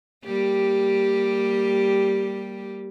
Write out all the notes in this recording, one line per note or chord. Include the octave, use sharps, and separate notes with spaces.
G3 A#3 G4